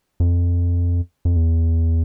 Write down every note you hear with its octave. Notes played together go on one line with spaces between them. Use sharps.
F2
F2
E2